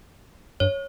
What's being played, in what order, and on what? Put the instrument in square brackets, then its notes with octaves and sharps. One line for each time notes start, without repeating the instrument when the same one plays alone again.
[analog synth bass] G2 [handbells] C#5